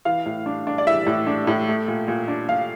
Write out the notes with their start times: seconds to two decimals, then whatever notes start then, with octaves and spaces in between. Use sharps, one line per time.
0.05 E3 F5
0.26 A2
0.46 D4
0.67 D4
0.78 D5
0.87 E3 E5
1.07 A2
1.27 D4
1.47 A2
1.68 A3
1.88 A#2
2.08 A#2
2.28 D4
2.49 A#2 F5